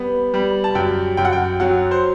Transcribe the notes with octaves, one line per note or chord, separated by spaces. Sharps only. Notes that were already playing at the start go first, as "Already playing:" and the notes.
Already playing: G3 B3
G3
A5
F#2 G5
F#2 G5
F#5
G5
F#3 F#5
C5